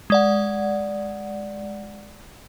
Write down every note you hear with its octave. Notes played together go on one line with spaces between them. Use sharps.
G#3 D5 F#5